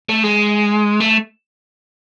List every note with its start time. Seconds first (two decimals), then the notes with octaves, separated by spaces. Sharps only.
0.09 A3
0.23 G#3
1.00 A3